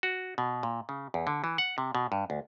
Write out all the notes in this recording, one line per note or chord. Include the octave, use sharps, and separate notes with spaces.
F#4
B2
A#2
C#3
E2
D3
E3
F#5
C3
B2
G2
D2